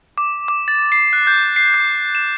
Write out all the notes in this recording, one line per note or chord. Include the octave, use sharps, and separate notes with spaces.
D6
D6
A6
C7
F#6
G6
C7
G6
E7